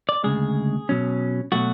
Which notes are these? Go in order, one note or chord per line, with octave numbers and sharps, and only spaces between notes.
D5
D2 C#3 G#3 G#4
B2 F#3 C#4
B2 F#3 A3 F#4